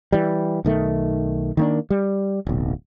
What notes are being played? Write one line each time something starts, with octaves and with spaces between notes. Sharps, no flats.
E3 G3
B1 D#3 A3
D#3 A#3 D4
G3
D1 B1